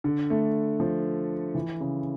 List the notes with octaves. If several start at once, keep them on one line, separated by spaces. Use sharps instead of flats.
D3
A3
F3
E3
C#3